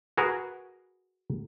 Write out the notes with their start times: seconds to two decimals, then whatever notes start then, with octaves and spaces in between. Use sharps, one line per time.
0.17 F#4 G#4 A#4 B4